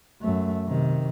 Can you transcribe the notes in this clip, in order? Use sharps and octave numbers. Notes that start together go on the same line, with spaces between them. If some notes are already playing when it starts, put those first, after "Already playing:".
F#2 A3
C3 D#3